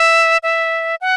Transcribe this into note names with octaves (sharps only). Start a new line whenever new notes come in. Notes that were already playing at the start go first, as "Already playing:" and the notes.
Already playing: E5
E5
F#5